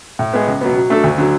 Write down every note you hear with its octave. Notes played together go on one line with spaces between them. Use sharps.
A2
G#3 B3
C#2
B2 F#3 B3
F#3
A3 D4 A4
D2
D3 F#3